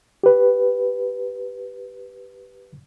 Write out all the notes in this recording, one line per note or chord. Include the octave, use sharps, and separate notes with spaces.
G4 B4